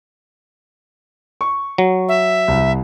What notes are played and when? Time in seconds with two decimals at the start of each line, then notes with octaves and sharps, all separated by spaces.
1.41 C#6
1.78 F#3
2.08 E5
2.48 C2